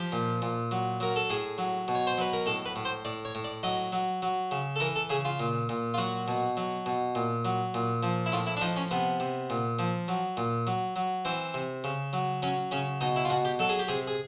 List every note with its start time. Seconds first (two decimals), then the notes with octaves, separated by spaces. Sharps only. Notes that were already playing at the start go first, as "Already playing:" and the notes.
Already playing: F3 G4
0.12 A#2
0.42 A#2
0.71 F#3
1.00 F#3 A#4
1.16 A4
1.30 A2 G#4
1.58 F#3
1.88 B2
1.95 C#5
2.07 C5
2.18 F#3 B4
2.33 A#4
2.46 A2 A4
2.66 B4
2.76 A2
2.85 C5
3.05 A2 D5
3.25 C#5
3.35 A2
3.44 D5
3.63 F#3 D#5
3.92 F#3
4.22 F#3
4.51 C#3
4.76 A4
4.80 E3 A#4
4.96 A4
5.10 C#3 G#4
5.25 F4
5.40 A#2
5.69 A#2
5.94 F4
5.98 F#3 F#4
6.28 B2
6.57 F#3
6.86 B2
7.15 A#2
7.45 F#3
7.74 A#2
8.03 F3
8.26 E4
8.32 A2 F4
8.47 E4
8.57 D4
8.61 F3 D#4
8.76 C#4
8.91 C3 B3
9.20 C3
9.50 A#2
9.79 F3
10.08 F#3
10.37 A#2
10.67 F#3
10.96 F#3
11.25 E3 C4
11.54 C3
11.84 C#3
12.13 F#3
12.43 F#3 C#4
12.71 C#3 C#4
13.01 B2 D#4
13.16 E4
13.25 F4
13.30 B2 F#4
13.45 G4
13.59 F#3 A4
13.69 G#4
13.79 G4
13.88 C3 G#4
14.07 G#4